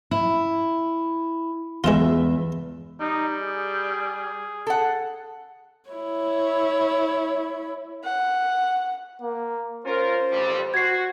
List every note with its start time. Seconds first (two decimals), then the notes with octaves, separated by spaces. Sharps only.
0.11 E4
1.84 E2 G#3 F4 E5
3.00 G3 D#4
3.42 G#4
4.67 A4 F#5
5.90 E4 C#5
8.05 F#5
9.22 A#3
9.86 C#4 F4 A#4 C5
10.32 A1 F2 G3
10.74 F#4 G#6 C7